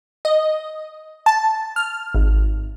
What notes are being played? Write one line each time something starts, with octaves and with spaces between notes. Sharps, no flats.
D#5
A5
F6
G#1